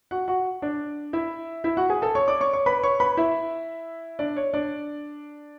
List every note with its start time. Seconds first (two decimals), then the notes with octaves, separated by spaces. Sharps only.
0.11 F#4 F#5
0.28 F#4 F#5
0.62 D4 D5
1.13 E4 E5
1.64 E4 E5
1.77 F#4 F#5
1.90 G#4 G#5
2.02 A4 A5
2.15 C#5 C#6
2.28 D5 D6
2.41 C#5 C#6
2.53 C#5 C#6
2.66 B4 B5
2.83 C#5 C#6
3.00 B4 B5
3.17 E4 E5
4.19 D4 D5
4.36 C#5
4.54 D4 D5